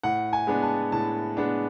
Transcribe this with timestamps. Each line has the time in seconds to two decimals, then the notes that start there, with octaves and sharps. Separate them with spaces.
0.03 A2 F#5
0.33 G#5
0.47 G#3 B3 D4
0.63 A5
0.92 A2 A5
1.37 G#3 B3 D4